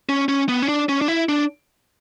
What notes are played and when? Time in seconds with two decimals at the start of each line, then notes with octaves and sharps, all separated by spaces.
0.09 C#4
0.29 C#4
0.49 B3
0.62 C#4
0.69 D4
0.89 C#4
1.01 D4
1.08 E4
1.29 D4